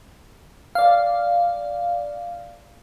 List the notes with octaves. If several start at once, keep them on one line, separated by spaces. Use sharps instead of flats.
D5 F5